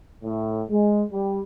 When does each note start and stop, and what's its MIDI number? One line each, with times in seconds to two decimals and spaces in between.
0.24 0.63 45
0.70 1.03 56
1.12 1.41 55